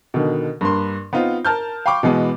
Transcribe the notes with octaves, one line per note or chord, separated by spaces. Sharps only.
B2 D3 D#3
G2 A#3 C6
B3 C4 D#4 F4
A#4 A5 F6 G6
F5 G5 B5 C#6 D6
B2 E3 G#3 B3